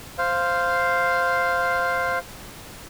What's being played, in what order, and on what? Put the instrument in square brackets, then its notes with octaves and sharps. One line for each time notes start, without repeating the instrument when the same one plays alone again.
[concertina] C5 F5